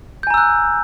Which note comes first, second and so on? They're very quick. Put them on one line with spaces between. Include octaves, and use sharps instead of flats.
G6 G#5 A#5 E6 F#6